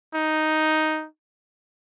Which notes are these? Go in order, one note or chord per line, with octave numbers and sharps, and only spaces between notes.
D#4